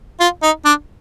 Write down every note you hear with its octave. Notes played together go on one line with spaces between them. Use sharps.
F4
D#4
D4